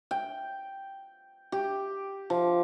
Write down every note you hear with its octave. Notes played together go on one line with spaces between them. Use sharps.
G5
G4
F3